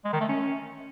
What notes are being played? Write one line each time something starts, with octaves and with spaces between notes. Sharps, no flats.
G#3
D#3
A3
C#4